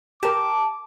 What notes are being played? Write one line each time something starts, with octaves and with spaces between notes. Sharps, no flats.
G4 A#4 A5 D6